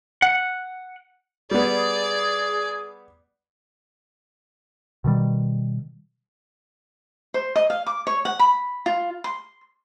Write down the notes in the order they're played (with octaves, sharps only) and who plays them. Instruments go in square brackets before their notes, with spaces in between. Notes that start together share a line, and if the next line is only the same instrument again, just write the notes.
[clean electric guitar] F#5
[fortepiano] G3 B3 [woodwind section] G#4 [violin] D5
[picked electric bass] B2 D#3 G3
[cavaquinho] C5
D#5
F5
D6
C#5
F#5
B5
F4
C6